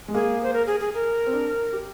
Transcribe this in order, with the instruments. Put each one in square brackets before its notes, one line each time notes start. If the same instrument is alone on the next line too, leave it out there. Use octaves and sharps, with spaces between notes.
[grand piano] G#3
[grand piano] A#3 [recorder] G#4
[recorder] C5
A#4
G#4
G#4
A#4
[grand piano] C4
D4
G4